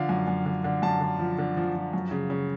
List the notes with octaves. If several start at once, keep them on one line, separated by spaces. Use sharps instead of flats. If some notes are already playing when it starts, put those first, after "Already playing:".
Already playing: D3 F3 F5
F#2
F#2
D3
D3
F#2 A5
D3
F3
D3
F3
F3
F#2
C#3
C#3